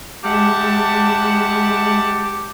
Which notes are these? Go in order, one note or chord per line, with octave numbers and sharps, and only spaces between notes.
G#3 G4 E5 F#5 A5